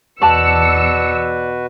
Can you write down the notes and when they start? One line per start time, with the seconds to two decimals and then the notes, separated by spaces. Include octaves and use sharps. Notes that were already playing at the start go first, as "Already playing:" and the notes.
0.22 E2 B2 F#4 B4 D5 A5 E6 C#7